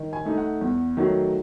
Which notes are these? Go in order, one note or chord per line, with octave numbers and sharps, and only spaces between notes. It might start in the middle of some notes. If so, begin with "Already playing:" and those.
Already playing: D#3
G#5
A3 D#4
F#5
E2
D#3 F#3 A3